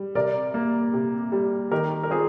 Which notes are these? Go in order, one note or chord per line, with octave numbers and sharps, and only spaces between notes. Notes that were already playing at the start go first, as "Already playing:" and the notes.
Already playing: G3
C3 A#4 D5
A#3
C3
G3
D#3 G4 A#4
A#4
C4 F4 G#4